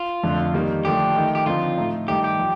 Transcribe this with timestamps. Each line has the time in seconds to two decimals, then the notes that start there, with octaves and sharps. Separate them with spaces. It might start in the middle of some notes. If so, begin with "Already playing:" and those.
Already playing: F4
0.23 F2 D3 F3 A3 D4
0.54 D#3 G3 A#3 D#4
0.85 D3 F3 A3 D4 G4
1.16 D#3 A3 D#4
1.35 G4
1.46 D3 F3 C4 D#4 F4
1.77 A2 A3 D#4
2.08 G2 D#3 A3 D#4 G4
2.24 G4
2.39 F3